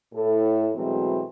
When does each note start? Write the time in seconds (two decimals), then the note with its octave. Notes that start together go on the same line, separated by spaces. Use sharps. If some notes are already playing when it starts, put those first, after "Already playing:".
0.14 A2 A4
0.74 B2 E3 F#3 G#3 A3 C4